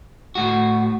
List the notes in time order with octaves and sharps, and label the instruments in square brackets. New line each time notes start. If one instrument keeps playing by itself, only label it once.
[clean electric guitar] A2 F#4